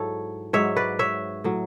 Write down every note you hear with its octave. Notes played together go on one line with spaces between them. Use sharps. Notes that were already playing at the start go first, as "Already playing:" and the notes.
Already playing: G#2 F#3 E4 A4 C#5
G#2 F#3 C#5 E5
B4 D5
C#5 E5
A2 F#3